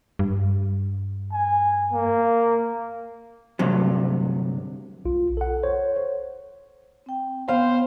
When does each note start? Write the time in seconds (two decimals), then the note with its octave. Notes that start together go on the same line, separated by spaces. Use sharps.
0.19 G2
1.33 G#5
1.93 A#3
3.59 D2 G2 C3 F#3
5.05 B1 F4
5.37 A4 F#5
5.63 C5 C#5
7.06 C4 G5
7.48 B3 C5 F5